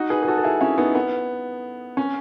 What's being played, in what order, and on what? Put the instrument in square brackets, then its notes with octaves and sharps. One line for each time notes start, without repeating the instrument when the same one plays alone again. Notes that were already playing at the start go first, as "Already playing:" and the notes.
Already playing: [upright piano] D#4 F#4
G#4 B4
G#4
F#4 A4
A4
E4 G#4
C#4 E4
B3 D#4
B3
C#4